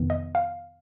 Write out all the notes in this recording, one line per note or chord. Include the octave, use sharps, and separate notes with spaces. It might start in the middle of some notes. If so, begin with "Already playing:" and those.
Already playing: F2 C3 D#3 B3
D#5
F5